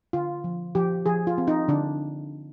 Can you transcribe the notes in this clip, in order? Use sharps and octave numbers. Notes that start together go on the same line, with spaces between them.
D3 F4
F3
F3 G4
F3 G#4
F4
C4
D#4
D3 D4